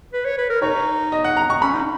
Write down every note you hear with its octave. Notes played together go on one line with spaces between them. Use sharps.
B4
C#5
B4
A#4
D#4 C#5
D#5
F#5
A#5
C#6
C#4 B5
D#4